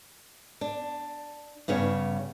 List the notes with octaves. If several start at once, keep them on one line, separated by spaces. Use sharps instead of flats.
D4
G2 C#3 B3 C#5